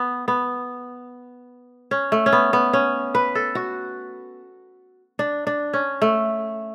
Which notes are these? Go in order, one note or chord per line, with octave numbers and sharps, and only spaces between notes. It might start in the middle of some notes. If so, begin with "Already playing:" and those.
Already playing: B3
B3
C#4
A3
C#4
B3
B3
C#4
B4
A4
F#4
D4
D4
C#4
A3